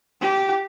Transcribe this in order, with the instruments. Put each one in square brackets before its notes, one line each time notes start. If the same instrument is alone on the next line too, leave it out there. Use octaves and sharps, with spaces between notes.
[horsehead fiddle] G4